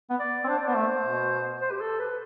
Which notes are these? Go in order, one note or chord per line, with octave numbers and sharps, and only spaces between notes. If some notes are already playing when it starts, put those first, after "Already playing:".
B3
D5
C4
D4 C5
D5
B3 C5
A3
B2
C5
G4
A4
B4